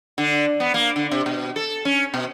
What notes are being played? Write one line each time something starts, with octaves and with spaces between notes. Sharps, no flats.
D3
B3
A#3
D3
C3
B2
A4
C#4
B2